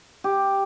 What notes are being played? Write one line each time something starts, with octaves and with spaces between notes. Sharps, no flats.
G4